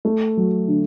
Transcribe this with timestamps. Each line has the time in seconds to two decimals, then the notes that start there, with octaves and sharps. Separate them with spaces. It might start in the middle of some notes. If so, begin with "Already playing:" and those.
0.05 A3
0.37 F#3
0.68 D3